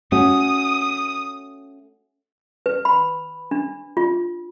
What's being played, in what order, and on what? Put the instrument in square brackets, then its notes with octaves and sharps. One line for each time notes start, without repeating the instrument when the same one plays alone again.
[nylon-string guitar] A3 C#4 F#4 [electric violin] D#6
[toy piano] B4
B5
D4
F4